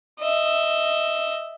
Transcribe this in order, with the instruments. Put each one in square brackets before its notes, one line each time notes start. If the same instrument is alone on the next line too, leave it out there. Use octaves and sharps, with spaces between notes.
[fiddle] D#5 E5